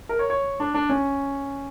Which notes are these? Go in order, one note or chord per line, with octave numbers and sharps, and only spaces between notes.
A#4
C#5
C#5
D4
D4
C#4